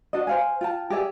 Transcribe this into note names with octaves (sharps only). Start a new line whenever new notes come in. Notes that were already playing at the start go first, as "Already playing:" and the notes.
D4 F#4 D#5
C5 F5 G#5
F4 G5 A5
G4 G#4 D5 E5